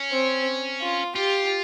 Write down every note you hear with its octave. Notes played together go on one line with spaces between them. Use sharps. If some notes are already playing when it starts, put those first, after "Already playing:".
Already playing: C#4
C4
F4
F4 G4